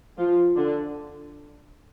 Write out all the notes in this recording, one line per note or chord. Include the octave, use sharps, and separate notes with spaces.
F3 F4
D3 D4